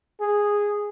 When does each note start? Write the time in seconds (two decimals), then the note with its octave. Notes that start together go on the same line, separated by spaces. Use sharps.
0.20 G#4